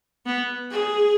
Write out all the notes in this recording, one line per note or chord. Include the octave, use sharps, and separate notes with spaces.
B3
G#4